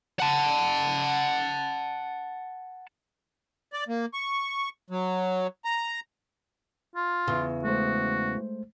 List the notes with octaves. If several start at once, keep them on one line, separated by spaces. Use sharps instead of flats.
F#5 A5
D5
A#3
C#6
F#3
A#5
F4
E2 C#3
G#3 A3 F#4 C5